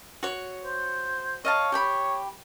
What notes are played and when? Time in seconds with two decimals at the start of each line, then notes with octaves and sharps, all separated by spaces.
0.23 F#4 C#5
0.65 C5
1.45 C#5 D#5 F5 A5
1.72 G4 G5 B5